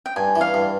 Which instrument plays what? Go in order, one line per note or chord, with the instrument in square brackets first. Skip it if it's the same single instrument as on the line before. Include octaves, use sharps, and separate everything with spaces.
[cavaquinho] G5
[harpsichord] G2 [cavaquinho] G#5
[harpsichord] E3
[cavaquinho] F5
[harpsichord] G2